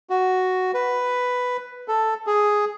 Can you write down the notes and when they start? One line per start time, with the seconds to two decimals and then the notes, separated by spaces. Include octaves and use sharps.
0.10 F#4
0.74 B4
1.88 A4
2.27 G#4